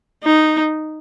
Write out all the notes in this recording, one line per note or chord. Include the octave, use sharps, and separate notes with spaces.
D#4